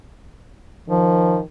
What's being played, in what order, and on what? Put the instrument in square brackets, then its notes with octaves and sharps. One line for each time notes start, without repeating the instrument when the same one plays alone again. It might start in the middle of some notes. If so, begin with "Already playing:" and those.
[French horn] D#3 [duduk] F3